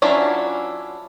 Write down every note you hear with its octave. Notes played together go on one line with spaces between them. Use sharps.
F#3 C#4 D4 E4 F4